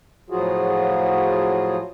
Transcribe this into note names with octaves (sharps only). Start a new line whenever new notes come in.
A2 F3 F#3 F4 F#4 G#4